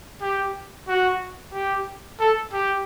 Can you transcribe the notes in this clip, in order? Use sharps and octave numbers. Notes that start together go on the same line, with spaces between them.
G4
F#4
G4
A4
G4